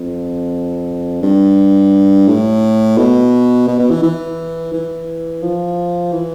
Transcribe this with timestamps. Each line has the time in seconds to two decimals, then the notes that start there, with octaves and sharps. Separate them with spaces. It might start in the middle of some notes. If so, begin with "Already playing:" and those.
Already playing: F2
1.22 G2
2.28 A2
2.98 B2
3.68 B2
3.79 B2
3.91 E3
4.03 E3
4.73 E3
5.43 F3
6.13 E3